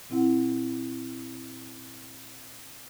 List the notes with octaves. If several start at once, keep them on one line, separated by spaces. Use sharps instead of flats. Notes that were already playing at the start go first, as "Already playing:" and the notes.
A#2 C4 E4 F#5